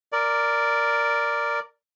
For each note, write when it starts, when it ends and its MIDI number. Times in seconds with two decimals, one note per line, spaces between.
0.12 1.60 70
0.12 1.60 74